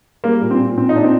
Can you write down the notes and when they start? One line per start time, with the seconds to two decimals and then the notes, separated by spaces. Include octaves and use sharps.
0.24 G3 A#3
0.41 A#2
0.51 C4
0.60 A#2
0.77 A#2 C4
0.89 D#4
0.95 A#2 D4
1.04 C4